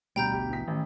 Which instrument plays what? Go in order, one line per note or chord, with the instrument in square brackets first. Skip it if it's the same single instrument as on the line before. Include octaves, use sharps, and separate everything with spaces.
[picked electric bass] D2 B2 [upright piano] G3 [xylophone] G5 A#5 G6
[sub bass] A1 [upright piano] G4
[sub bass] A#1 [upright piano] E3 B6
[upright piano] A1 [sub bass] D#3